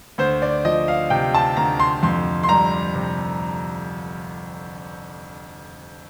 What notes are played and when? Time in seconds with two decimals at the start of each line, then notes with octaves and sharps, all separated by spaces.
0.18 D2 C5
0.42 D5
0.65 F3 D#5
0.88 F5
1.10 C3 G5
1.35 A5
1.57 D2 A#5
1.80 C6
2.03 F2 C6
2.43 C6
2.49 G3 A#5
2.95 C3